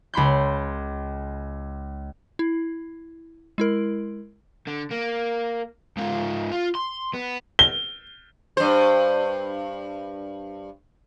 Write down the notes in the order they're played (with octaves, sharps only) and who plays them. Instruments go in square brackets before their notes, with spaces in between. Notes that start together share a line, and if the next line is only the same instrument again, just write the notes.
[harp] C#2 B5 C6 G6
[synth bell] E4
G#3 E4 A#4
[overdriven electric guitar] D3
A#3
G#2 F4
F4
C6
B3
[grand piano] G7
[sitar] G2 C5